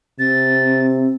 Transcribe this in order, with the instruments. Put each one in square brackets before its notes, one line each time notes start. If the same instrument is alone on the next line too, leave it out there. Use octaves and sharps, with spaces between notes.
[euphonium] C3 [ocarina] C4 [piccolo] A6